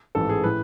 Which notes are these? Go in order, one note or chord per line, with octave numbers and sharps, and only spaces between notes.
A1 G#2 E3 A4
G#4
A2 E3 B4